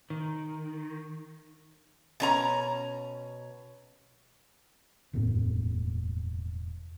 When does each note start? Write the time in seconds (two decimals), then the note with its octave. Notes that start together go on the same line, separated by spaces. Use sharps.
0.10 D#3
2.20 B2 C#4 A#5
5.13 E1 F#2 A2 C4